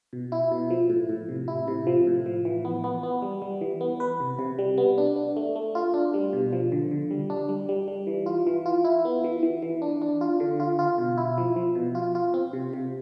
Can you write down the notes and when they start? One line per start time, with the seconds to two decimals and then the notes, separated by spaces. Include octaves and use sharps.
0.13 B2
0.32 E4
0.52 B2
0.70 F3
0.90 A2
1.09 A2
1.29 C3
1.48 E4
1.68 C3
1.87 F3
2.07 A2
2.26 F3
2.45 E3
2.65 B3
2.84 B3
3.03 B3
3.22 G3
3.42 G3
3.61 E3
3.81 B3
4.00 B4
4.20 C3
4.39 C3
4.59 G3
4.78 B3
4.98 D4
5.16 D4
5.37 A3
5.56 A3
5.75 F4
5.94 D4
6.14 G3
6.33 B2
6.53 F3
6.72 D3
6.91 D3
7.11 G3
7.30 D4
7.49 G3
7.69 G3
7.88 G3
8.07 E3
8.26 F4
8.47 E3
8.66 F4
8.85 E4
9.05 B3
9.24 E3
9.43 E3
9.62 E3
9.82 D4
10.02 D4
10.21 F4
10.40 D3
10.60 F4
10.79 F4
10.98 B2
11.18 E4
11.38 F3
11.56 F3
11.75 B2
11.95 F4
12.15 F4
12.34 C4
12.53 C3
12.73 C3